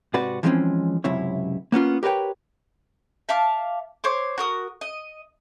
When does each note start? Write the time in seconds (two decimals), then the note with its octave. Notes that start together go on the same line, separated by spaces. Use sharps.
0.14 G#2 C3 F#4 B4 D5
0.43 E3 F3 G#3 A3 C4 C#4
1.04 C#2 F#2 C3 E4 C#5
1.72 A#3 B3 C#4 F4
2.03 G4 A#4 B4 C#5 G5
3.29 E5 F5 A5 D6
4.04 C5 C#5 D6
4.38 F#4 A#4 D#6
4.81 D#5